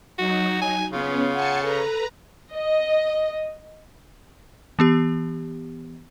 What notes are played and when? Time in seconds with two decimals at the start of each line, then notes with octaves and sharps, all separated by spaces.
0.18 F#3 D#4 F#4
0.61 G#5
0.93 C#3 B3 C#4 F4
1.34 F#5 G#5 A5 C#7
1.63 A4 B4 A#5
2.55 D#5
4.79 E3 B3 G4